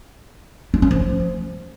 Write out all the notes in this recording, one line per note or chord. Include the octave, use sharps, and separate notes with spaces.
D4
C#4
F3